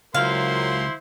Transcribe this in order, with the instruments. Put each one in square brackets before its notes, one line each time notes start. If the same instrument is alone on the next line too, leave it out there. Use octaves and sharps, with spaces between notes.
[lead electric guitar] C#2 [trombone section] F#3 F4 A#4 [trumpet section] E4 C5 C6 [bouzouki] F5